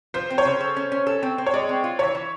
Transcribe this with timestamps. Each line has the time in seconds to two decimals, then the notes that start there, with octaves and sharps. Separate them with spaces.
0.14 F3 C5
0.30 C4
0.38 C#5
0.45 C#3
0.61 A4
0.76 C#4
0.92 C#4
1.07 A4
1.23 C4
1.38 C4
1.46 C#5
1.54 G#3 D5
1.69 C4
1.84 F4
1.99 E3 C#5
2.15 E3